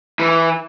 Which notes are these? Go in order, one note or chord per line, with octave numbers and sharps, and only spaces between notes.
E3